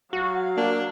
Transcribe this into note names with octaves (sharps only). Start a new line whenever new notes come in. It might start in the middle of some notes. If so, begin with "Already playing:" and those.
F#3 F#4 F5
A#3 D4